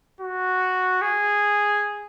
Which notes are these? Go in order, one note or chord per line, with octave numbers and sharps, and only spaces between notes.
F#4
G#4